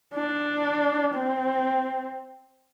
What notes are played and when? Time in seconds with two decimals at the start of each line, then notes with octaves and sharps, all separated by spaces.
0.15 D4
1.14 C4